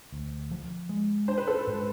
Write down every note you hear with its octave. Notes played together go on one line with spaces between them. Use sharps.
D2
F3
G#3
D4 C5
B4
A4 C5
G#2